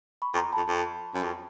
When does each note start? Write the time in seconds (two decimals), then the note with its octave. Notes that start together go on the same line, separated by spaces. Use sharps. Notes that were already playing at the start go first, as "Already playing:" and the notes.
0.22 B5 C#6
0.34 F2
0.37 A#5 C6
0.52 F2 A5 B5
0.68 F2
1.14 F#2
1.23 F2